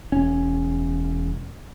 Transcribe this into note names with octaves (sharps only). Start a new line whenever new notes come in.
E1 C#4